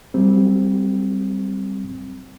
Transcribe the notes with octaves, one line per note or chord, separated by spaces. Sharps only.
F#3 G3 C4